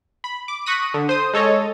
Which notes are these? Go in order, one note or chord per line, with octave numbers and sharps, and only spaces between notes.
B5
D6
C#6 D#6 F#6 A#6 B6 D#7
D3
C5 D#6
G#3 A4 C#5 D#5